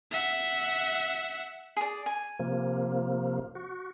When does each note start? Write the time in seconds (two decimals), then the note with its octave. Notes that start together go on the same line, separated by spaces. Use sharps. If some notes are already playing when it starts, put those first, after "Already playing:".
0.11 E5 F#5
1.77 G#4 D5
2.06 G#5
2.39 C3 F3 A#3
3.55 F#4